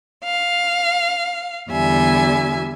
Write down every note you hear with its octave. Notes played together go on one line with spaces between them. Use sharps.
F5
E2 D3 G3 E5 G#5